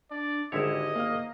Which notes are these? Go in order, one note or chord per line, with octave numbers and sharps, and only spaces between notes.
D4 D5
G#1 D3 G#3 E4 G4 C#5 D#5 E7
A#3 F5 F6